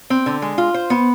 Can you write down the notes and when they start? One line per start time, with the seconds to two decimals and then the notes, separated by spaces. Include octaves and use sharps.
0.10 C4
0.26 D3
0.42 G#3
0.58 F4
0.74 C5
0.90 B3